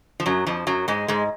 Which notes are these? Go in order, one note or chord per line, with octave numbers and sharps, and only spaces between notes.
F3
F#2 F#3
F2 F3
F#2 F#3
G#2 G#3
G#2 G#3